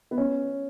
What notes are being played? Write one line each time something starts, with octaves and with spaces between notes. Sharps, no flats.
B3
C#4